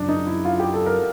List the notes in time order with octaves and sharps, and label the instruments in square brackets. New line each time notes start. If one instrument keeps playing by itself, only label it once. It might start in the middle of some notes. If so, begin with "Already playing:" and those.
Already playing: [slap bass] F#2 C#3 F3 [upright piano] D4
[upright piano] D#4
E4
F4
G4
A4
A#4